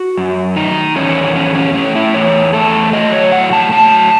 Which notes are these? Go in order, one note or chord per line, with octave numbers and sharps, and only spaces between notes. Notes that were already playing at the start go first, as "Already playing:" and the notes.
Already playing: F#4
F#2
D#3 D#4
E2 C#4
E3 C#4
C#4
A2 C#4
E4
E2 C#5
A3 A4
F#3 D#5
C#5
A2 F#5
A5
F#3 A5